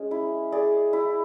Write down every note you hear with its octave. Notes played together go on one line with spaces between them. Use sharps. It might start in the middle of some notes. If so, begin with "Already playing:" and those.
Already playing: G#3 C#4 G#4
E4
G#4 D5
E4